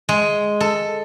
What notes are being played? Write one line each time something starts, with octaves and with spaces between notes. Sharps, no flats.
G#3
A4